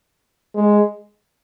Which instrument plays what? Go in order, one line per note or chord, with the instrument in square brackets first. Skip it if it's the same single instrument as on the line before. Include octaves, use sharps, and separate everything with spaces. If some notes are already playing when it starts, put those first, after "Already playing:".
[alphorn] G#3